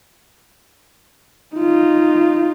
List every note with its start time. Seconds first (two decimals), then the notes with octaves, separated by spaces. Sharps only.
1.56 D#4 F4